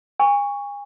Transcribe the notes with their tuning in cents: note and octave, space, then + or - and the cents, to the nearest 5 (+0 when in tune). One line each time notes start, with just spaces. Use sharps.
G#5 -35 C#6 +10